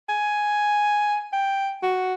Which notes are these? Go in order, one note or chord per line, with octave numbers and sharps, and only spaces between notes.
G#5
G5
F#4